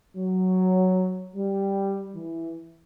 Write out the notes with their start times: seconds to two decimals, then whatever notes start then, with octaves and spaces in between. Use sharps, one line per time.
0.16 F#3
1.35 G3
2.15 E3